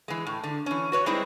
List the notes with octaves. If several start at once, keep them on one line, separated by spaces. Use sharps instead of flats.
E3 G#3
A2
D3
E3 C#4
F#4 B4 C#5
G3 G#3 C4 D#4 E4